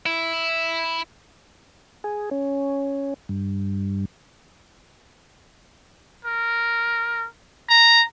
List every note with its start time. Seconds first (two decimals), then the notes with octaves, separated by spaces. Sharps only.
0.06 E4
2.04 G#4
2.31 C#4
3.29 G2
6.25 A#4
7.69 A#5